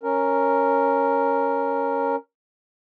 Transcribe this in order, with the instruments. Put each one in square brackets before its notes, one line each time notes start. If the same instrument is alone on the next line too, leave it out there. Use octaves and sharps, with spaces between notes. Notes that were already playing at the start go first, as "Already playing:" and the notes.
[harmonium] C#4 A#4